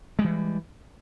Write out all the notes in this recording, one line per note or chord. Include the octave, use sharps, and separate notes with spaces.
E3 G3 G#3